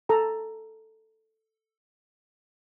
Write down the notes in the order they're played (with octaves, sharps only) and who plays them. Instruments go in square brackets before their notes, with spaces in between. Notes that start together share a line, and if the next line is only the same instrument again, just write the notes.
[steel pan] A4 A#5